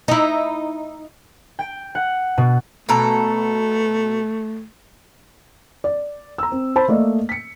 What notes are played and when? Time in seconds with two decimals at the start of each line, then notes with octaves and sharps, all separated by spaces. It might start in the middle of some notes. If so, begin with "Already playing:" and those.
0.08 D#4 E4
1.59 G5
1.95 F#5
2.38 B2
2.89 B2 A3 A4 A#5
5.84 D5
6.38 A#5 E6
6.52 C4
6.76 C5 A5 B5
6.88 A3 A#3 D5 D#5
7.29 B6 C#7